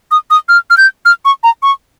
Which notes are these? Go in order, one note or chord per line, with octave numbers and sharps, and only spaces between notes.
D#6
D#6
F6
F6
G6
F6
C#6
A#5
C#6